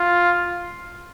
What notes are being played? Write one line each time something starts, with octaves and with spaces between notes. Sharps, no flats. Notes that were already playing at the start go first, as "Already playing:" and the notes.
Already playing: F4